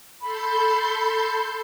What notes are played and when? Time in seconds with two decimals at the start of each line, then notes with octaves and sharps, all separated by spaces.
0.21 A4 B5 C6 G6